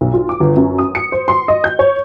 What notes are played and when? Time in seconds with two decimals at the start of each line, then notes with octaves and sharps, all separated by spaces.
0.01 B1
0.14 F4
0.29 D6
0.40 G1
0.56 F#2
0.78 D#6
0.95 C#7
1.12 C5
1.28 C6
1.48 D#5
1.64 G6
1.79 C#5